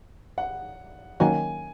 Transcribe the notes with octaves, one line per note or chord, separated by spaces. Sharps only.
F#5
D#3 F#3 A#3 C#4 F#4 G#5